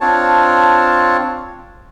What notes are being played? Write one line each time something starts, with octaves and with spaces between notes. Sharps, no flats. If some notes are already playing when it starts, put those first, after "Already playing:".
C4 D4 F4 C#5 A5